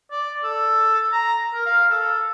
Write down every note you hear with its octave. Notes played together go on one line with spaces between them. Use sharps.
D5
A4
A#5
A#4
F5
A4